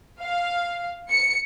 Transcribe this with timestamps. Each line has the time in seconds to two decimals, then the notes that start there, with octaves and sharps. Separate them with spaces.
0.21 F5
1.09 C#7